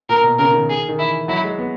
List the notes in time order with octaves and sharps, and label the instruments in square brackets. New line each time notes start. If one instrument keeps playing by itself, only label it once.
[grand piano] A#2 [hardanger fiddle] A#4
[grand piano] B2
[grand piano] C#3 [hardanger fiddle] A#4
[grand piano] D#3
[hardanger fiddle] G#4
[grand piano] D#3
[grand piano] E3 [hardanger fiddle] E4
[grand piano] F#3 [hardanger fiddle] E4
[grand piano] G#3
B3